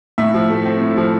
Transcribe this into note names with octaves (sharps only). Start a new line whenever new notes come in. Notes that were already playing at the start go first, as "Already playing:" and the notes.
A2 E5
F3
A3
C4
A2
F3